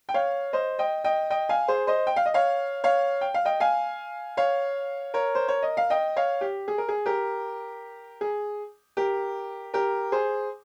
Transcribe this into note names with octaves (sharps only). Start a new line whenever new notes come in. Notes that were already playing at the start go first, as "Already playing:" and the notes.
G5
C#5 F5
C5 D#5
D#5 G5
D#5 G5
D#5 G5
F5 G#5
G#4 C5
C5 D#5
G5
F5
D#5
C#5 F5
C#5 F5
G5
F5
D#5 G5
F5 G#5
C#5 F5
A#4 C#5
C5
C#5
D#5
F5
D#5 G5
C#5 F5
G4
G#4
A#4
G#4
G4 A#4
G#4
G4 A#4
G4 A#4
G#4 C5